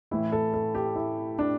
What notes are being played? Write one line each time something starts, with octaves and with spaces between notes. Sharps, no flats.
A2 E3 E4
A4
A4
G4
E4
D4